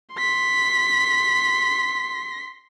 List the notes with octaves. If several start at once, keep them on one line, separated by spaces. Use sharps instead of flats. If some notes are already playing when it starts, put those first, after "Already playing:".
C6 B6